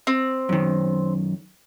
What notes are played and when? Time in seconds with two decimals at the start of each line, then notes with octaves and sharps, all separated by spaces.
0.07 C4
0.49 F#2 D#3